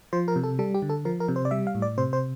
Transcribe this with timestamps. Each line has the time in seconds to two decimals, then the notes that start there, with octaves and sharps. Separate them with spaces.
0.13 F3 C5
0.28 A#4
0.36 C3
0.44 A4
0.59 G3 A4
0.75 G4
0.82 D3
0.90 A4
1.05 F3 A#4
1.20 A#4
1.28 C3
1.36 C5
1.45 D5
1.51 G3 E5
1.67 F5
1.75 A2
1.82 D5
1.98 C3 C5
2.13 C5